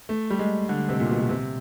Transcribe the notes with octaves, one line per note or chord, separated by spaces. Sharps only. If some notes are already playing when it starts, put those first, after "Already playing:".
A3
G3
G#3
D3
C3
A#2
B2
B2
C3